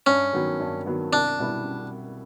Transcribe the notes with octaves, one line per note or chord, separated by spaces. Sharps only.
G2 C#4
D#3 F#3 B3
G2
D#3 F#3 B3
C2 D4
B2 G3 B3 E4